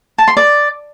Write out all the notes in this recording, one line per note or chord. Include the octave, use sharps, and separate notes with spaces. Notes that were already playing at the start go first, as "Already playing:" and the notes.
A5
C6
D5